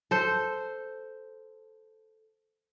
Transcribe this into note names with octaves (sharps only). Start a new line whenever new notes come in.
A4 C5